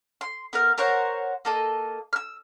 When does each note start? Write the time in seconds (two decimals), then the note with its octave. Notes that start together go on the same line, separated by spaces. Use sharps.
0.21 C6
0.53 B3 A#4 F5
0.78 A#4 C5 C#5 F#5
1.45 A#3 A4 D#5
2.13 E6 F6